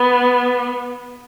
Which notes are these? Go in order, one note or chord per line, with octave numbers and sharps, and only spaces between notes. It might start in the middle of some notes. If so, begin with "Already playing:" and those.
Already playing: B3